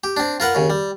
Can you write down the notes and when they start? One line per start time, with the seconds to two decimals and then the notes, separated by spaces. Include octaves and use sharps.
0.04 G4
0.17 C4 D4
0.40 F4 A#4 B4 F#5
0.55 D#2 C#3
0.70 G3